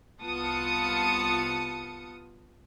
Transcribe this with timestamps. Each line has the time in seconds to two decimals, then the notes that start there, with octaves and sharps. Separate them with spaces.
0.21 C2 B3 F4 A5 D#6 C#7